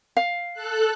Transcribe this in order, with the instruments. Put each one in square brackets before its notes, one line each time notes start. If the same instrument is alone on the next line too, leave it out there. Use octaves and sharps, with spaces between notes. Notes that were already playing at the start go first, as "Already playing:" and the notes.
[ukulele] F5
[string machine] A4 F#6